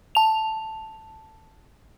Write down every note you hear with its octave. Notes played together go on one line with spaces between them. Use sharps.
A5 F7